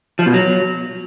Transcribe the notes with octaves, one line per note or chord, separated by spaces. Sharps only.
F3
B2
F#3